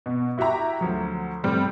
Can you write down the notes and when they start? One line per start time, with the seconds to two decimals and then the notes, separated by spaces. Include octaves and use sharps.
0.06 B2
0.38 E4 F#4 G4 E5 A#5
0.81 D2 F3 F#3
1.44 G1 A2 C3 G3 C4